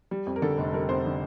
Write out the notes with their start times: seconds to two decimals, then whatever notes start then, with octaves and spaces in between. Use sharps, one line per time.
0.11 G3
0.26 F2
0.36 A#4
0.42 D3 A4
0.58 F1
0.74 G3 A#4
0.89 F2 C5
1.06 D3